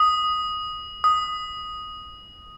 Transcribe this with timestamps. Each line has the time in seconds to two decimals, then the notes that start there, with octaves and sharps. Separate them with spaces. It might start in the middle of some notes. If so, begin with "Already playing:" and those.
Already playing: D#6
1.04 D#6